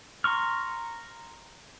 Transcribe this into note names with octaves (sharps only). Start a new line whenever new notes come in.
A#5 C6 C#6 F6